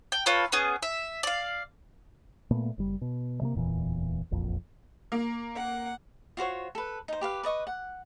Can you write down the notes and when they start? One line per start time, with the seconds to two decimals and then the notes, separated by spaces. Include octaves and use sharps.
0.12 G5
0.26 F4 A4 B4 C#5
0.52 B3 C#4 G#4
0.83 E5
1.23 D5 F5
2.51 A#2 A3 B3
2.78 F#1 G3
3.01 B2
3.41 C3 G#3 A#3
3.55 D1 E2 A#2 E3
4.31 E1 A#1 F2
5.12 A#3
5.55 F#5
6.37 F4 F#4 C5 C#5
6.75 A4 B4
7.08 D#4 C5
7.21 G4 B4 F5
7.43 B4 D5 D#5 C#6
7.67 F#5